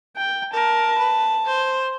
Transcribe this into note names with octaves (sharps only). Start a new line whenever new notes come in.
G5
A#4 A5
B4
C5